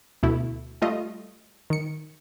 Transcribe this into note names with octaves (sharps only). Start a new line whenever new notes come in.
D2 B2 A3 E4
G3 A3 F4 D#5
D#3 C#7